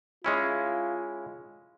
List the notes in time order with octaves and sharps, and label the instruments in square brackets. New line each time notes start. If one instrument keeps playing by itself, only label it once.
[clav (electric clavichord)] G#3 C#4 E4 [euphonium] F4